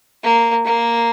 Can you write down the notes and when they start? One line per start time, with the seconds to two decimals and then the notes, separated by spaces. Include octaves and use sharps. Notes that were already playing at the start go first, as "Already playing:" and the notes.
0.23 A#3
0.65 A#3